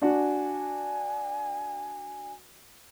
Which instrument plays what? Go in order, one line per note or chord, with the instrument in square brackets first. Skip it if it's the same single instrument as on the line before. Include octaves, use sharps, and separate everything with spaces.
[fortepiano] D4 F#4 [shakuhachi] G#5